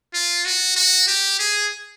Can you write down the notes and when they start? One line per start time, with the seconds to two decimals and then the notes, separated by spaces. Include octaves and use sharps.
0.14 F4
0.45 F#4
0.76 F#4
1.08 G4
1.39 G#4